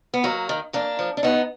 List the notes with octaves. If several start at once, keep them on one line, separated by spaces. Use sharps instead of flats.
B3
D#2 F#3 A#3
D#3
F2 A#3 D4
F3
D4
D#2 B3 D#4